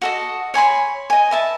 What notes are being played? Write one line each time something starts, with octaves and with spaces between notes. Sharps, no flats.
F#4 A4 D#5
C#5 G#5 B5 C6
D#5 G#5
B4 E5 A5